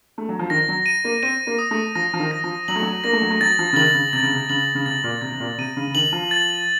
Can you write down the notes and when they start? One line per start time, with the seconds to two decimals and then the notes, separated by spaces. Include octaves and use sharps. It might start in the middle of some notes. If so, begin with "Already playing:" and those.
0.18 A3
0.29 F#3
0.39 F3
0.50 D#3 A#6
0.68 F#3
0.86 D#7
1.05 A#3
1.22 C4 D#7
1.47 A#3
1.59 D#6
1.71 A3
1.95 F3 A#6
2.13 F3
2.20 D#3
2.31 A#6
2.44 F3
2.68 F#3 F#7
2.75 A3
2.82 F#3
3.04 A#3 A#6
3.13 A3
3.22 F#3
3.30 A3
3.41 F#3 A6
3.59 F3
3.73 C#3
3.76 D#3 F#7
3.94 C#3
4.13 C3 A6
4.23 C#3
4.33 C3
4.49 C#3 F#7
4.75 C#3
4.86 C3 A6
5.04 A#2
5.22 C3 A6
5.32 C3
5.40 A#2
5.58 C3 D#7
5.77 C#3
5.87 C#3
5.95 D#3 F#7
6.13 F3
6.31 A6